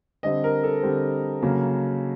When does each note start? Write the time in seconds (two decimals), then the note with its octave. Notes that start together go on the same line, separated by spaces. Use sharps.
0.23 D3 G3 C4 D#5
0.44 A#4
0.64 A4
0.83 D3 G3 C4
1.42 C#3 F#3 A#3